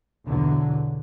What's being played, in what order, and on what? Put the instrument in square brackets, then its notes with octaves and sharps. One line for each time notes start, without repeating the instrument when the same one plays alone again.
[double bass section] B1 E2 D3 F#3